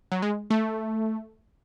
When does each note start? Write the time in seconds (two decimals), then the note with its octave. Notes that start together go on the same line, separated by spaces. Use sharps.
0.12 F#3
0.22 G#3
0.50 A3